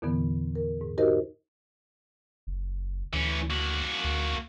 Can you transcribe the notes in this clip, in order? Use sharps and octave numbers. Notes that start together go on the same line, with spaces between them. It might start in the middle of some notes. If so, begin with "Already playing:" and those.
E2 A#2 D3 E3 B3
A#4
G#2
D#4 F#4 G4 A#4 C5 D#5
F#1
D2 E3 C#4
A#3 F#4
D2